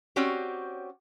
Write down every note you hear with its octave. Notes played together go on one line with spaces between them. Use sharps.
C4 C#4 F#4 G4 C#5 D5